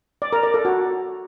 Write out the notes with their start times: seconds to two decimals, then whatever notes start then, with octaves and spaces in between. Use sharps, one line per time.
0.22 D5
0.33 A#4
0.43 D5
0.54 A4
0.65 F#4